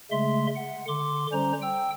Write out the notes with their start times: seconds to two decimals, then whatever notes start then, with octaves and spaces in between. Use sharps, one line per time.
0.11 C#3 G#3 A3 E5 C6
0.55 F#5
0.88 D3 C6 D6
1.32 D3 G3 C#4 C5 A#5
1.62 G5 E6